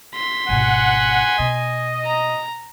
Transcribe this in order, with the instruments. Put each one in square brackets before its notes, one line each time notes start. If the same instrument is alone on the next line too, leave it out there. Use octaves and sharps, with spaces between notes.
[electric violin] C6 B6
[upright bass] G#1 B2 [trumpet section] F#5 [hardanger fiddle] G#5
[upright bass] B2 [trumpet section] D#5
[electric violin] A#5